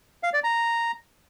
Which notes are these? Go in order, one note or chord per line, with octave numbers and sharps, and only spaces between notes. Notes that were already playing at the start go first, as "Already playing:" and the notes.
F5
D5
A#5